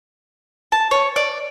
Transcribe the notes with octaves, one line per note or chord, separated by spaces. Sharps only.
A5
C#5
D5